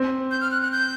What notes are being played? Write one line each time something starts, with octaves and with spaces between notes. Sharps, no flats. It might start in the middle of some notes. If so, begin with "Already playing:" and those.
Already playing: C4
G6
F6
F#6
F#6
G6